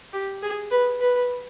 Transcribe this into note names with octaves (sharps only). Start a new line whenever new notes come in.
G4
G#4
B4
B4